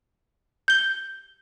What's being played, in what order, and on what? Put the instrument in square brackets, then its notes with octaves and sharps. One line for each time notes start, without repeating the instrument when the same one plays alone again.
[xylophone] G6 G7